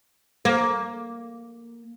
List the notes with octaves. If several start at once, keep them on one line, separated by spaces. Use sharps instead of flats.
A#3